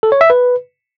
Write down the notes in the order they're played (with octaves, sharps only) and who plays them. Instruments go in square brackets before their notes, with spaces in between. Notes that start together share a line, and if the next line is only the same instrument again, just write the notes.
[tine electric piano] A4
C#5
E5
B4